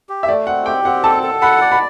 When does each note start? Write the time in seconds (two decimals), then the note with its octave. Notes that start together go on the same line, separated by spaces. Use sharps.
0.09 G4
0.23 E5
0.28 A3 D5
0.47 C4 F#5
0.66 G4 G5
0.85 C4 F#5
1.04 A4 A5
1.23 A4
1.42 F#5 B5
1.61 D5
1.72 B5